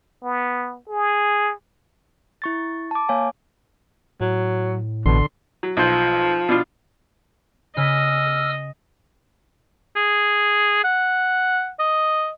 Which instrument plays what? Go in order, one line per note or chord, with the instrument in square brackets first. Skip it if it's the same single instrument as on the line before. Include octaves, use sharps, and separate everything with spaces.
[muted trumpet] B3
G#4
[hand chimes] E4 C#6 A6
A5 D6
A#3 C#5 F5 G#5
[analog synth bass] A2 [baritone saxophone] F#3
[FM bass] A1 [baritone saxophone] B2 [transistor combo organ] D3 C6
[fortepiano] F#3
[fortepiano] B1 C5 [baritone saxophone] F3
[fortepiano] B2 D4 F4
[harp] C#3 G#5 B6 [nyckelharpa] D#5 [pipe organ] E6 F6
[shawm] G#4
F#5
D#5